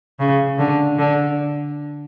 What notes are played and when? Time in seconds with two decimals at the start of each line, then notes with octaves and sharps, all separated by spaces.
0.20 C#3
0.59 D3
0.99 D3